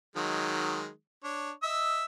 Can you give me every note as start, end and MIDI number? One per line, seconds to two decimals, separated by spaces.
0.16 0.89 51
0.16 0.89 54
0.16 0.89 56
1.24 1.51 62
1.24 1.51 73
1.63 2.05 75
1.63 2.05 76
1.63 2.05 88